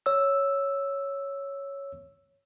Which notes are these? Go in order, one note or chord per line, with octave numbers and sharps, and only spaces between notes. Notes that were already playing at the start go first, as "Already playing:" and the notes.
C#5 E6